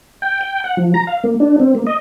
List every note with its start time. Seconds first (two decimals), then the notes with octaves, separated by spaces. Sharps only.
0.22 G5
0.41 G5
0.64 F#5
0.77 F3
0.94 A#5
1.07 F5
1.24 A#3
1.40 D4
1.60 C4
1.75 A#3
1.87 D#5